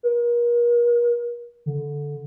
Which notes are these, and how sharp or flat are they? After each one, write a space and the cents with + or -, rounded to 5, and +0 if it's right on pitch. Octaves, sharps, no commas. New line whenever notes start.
A#4 +40
D3 -10